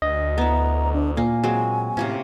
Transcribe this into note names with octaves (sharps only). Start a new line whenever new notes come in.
D2 D#5
B3 E4 A#5
D4
A#2 A#3 G#5
F#3 G#3 C4
A2 C3 A#3 C#4